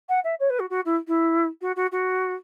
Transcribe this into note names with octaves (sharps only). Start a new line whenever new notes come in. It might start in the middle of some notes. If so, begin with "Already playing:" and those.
F#5
E5
C#5
B4
F#4
F#4
E4
E4
F#4
F#4
F#4